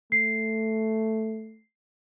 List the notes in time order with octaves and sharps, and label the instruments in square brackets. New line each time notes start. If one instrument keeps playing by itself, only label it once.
[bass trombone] A3 [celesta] C7